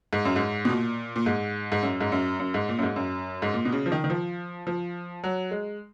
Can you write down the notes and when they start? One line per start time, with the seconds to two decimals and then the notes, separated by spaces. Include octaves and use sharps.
0.13 G#2
0.25 F#2
0.36 G#2
0.65 B2
0.70 A#2
1.16 A#2
1.26 G#2
1.72 G#2
1.83 F#2
2.01 G#2
2.12 F#2
2.40 F#2
2.54 G#2
2.69 A#2
2.79 F#2
2.83 G#2
2.96 F#2
3.42 G#2
3.54 A#2
3.65 B2
3.72 C#3
3.86 F3
3.92 D#3
4.04 D#3
4.10 F3
4.67 F3
5.24 F#3
5.51 G#3